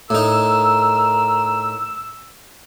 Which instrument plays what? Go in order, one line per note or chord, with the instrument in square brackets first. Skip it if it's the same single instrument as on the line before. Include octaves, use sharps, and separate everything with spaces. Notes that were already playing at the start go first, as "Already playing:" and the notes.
[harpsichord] A2 D#4 [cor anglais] A#4 [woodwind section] E6